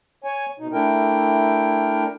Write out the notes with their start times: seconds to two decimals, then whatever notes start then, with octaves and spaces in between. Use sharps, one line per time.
0.24 C#5 G#5
0.60 B2 D#4
0.73 A3 D4 E4 A#4 G5